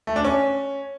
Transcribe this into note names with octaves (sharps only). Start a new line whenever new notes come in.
A3
D4
C#4